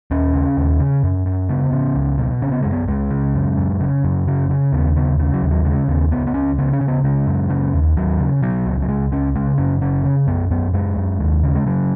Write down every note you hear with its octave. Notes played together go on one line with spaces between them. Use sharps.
D#2 C#4
C#3
D#2
C#3
F#2
F#2
C#3 B3
C#3
C#2
B2
C#3 C#4
B3
F#2 G#3
B3
C#2 G#3
C#3
F#2
F#2
C#3
F#2
C#3 F#3
C#3
D#2 B3
C#3 B3
C#3
F#3
D#2
F#3
C#3 G#3
D#2 B3
C#2 B3
B3
C#2 C#4
C#3 B3
C#4
C#3
B3
C#3 G#3
F#2
C#3
D#2
D#2 F#3
C#3
B2 F#3
C#2
F#3
C#2 G#3
C#2 C#4
C#3 G#3
F#2 C#4
C#3 C#4
C#3
F#2 B3
F#2 B3
F#2 G#3
F#2
D#2
C#3
G#3
C#3 F#3